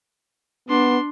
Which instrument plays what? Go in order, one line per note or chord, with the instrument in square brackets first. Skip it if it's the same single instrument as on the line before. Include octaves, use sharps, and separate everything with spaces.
[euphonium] B3 [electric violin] D4 C6